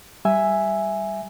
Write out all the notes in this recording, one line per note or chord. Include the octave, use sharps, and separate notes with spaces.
G3 E5 G#5